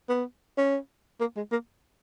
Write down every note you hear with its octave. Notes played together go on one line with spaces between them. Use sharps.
B3
C#4
A#3
G#3
A#3